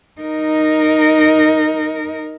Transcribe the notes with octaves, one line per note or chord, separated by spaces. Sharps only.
D#4 A#4